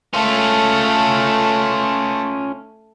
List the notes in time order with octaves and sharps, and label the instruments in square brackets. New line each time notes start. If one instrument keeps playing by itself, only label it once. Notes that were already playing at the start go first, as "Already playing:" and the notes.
[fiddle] A3 A4 [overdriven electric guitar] C#4 F4